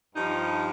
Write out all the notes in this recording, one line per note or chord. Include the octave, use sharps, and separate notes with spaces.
G2 F3 D#4